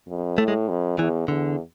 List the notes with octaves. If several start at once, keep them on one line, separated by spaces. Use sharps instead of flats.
F2
A2 A3
G#3
F2
E2 E3
E2 D3